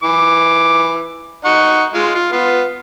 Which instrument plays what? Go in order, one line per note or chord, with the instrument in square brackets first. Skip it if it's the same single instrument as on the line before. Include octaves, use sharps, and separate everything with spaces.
[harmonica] E3 D6
D#4 F#5 C#6
G#3 F4
F4
B3 F4